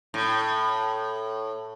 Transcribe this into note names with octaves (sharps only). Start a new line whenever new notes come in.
A2